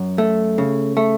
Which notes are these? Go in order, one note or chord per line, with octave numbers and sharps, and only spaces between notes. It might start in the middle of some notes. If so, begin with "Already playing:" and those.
Already playing: F#2
A3
C#3
A3